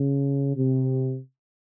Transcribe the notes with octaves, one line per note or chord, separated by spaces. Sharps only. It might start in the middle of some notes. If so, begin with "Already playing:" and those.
Already playing: C#3
C3